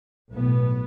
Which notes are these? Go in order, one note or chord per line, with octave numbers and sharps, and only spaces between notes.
B1 A2 B3